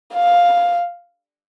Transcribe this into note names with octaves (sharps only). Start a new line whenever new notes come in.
F5